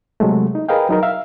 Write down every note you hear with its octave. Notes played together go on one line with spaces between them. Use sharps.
C3 F#3 G#3 A3
D#4
G#4 A#4 B4 D#5 F5 G5
F#3 D#4 A#4
E5 F5